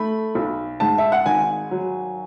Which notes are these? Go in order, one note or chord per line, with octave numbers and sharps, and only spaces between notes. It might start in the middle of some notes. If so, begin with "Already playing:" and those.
Already playing: A3 B5
B1
G#2 A5
E5
F#5
G#1 G#5
F#3